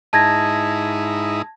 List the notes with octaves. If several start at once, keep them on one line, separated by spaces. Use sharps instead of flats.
G#2 D#4 E4 A5 G#6 A#6